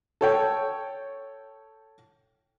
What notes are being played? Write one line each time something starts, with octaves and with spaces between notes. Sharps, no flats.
A4 C#5 G5